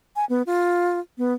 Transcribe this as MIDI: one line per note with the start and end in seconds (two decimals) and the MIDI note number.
0.16 0.25 80
0.29 0.42 59
0.46 0.99 65
1.18 1.33 59